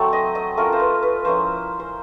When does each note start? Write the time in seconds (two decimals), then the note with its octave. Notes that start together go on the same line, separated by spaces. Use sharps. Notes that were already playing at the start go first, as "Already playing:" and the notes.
Already playing: F#3 A3 C4
0.13 D#5
0.35 D#5
0.57 A3 C#4 F4 A#4
0.72 C5
0.80 B4
1.02 B4
1.25 F3 A#3 C#4 E4 C5
1.80 C5